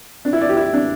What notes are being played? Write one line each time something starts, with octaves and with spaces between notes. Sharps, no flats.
D4
E4
D5
G4
E4
D4